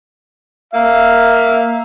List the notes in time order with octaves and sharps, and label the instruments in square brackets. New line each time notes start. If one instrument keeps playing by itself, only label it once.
[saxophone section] A#3 F5 [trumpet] E5